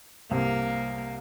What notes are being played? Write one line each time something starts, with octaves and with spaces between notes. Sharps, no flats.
C2 C3 A#3